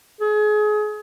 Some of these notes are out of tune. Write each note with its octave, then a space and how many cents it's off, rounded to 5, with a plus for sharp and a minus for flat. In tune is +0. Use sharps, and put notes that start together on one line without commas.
G#4 +30